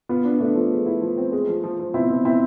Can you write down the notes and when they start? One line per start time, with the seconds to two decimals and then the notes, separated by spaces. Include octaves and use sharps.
0.09 B3 F4
0.25 D4
0.40 A3 D4
0.56 F3
0.71 G#3
0.86 E4
1.02 F3
1.18 C4
1.32 G#3
1.49 F3
1.64 F3
1.80 F3
1.94 B2 C4 E4
2.10 B2
2.25 B2 C4 E4